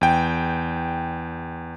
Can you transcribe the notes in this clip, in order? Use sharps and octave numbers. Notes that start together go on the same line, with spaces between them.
E2 G5